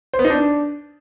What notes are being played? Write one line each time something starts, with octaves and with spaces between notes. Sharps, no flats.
C5
B3
D#4
D4